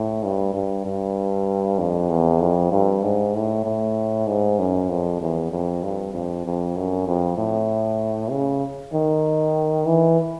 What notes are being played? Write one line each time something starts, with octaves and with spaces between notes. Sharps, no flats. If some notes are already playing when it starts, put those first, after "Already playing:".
Already playing: A2
G2
G2
G2
F2
E2
F2
G2
G#2
A2
A2
G#2
F#2
F2
E2
F2
G2
F2
F2
F#2
F2
A2
C#3
D#3
E3